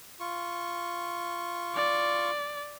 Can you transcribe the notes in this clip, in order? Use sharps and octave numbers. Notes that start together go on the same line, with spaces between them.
F4 C#6
D5